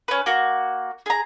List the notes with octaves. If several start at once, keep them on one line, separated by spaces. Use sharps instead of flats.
C#4 B4
A#3 F#4
G#4 A#5